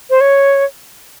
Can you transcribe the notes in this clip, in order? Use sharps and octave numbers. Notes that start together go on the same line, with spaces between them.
C5
C#5